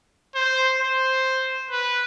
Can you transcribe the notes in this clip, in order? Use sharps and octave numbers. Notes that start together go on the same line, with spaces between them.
C5
C5
B4